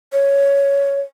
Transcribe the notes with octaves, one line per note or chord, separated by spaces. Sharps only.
C#5